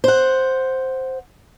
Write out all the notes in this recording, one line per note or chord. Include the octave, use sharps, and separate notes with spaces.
C5 F#5